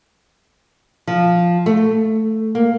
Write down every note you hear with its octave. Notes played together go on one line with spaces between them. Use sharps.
F3
A3
A#3